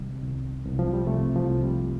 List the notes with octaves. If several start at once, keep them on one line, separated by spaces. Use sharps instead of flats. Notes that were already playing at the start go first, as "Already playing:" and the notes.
Already playing: C3 D#3 G3
C2
C2
F3
G3
C3 A3
F3
C2
G3